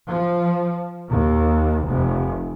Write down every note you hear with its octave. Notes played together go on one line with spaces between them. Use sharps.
F3
D#2
F1